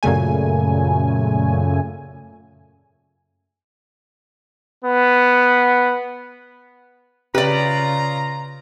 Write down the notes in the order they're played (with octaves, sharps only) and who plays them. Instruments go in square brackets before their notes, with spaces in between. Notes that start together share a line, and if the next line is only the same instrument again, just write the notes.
[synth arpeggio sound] F#2 A#2 C#3 A3 G#5
[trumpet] B3
[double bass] C#3 [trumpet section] F4 A#5 [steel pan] G4 [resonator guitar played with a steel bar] B4 D5